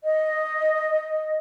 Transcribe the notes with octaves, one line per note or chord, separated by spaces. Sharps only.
D#5